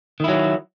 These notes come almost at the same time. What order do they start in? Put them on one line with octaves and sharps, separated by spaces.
D#3 E4 F#3